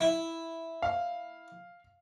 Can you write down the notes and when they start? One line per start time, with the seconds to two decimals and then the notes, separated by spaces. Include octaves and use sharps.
0.01 E4
0.82 F5